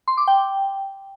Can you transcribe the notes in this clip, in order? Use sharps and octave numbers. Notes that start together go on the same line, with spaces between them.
C6
D6
G5